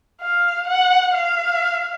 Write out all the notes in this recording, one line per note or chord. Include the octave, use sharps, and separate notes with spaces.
F5
F#5
F5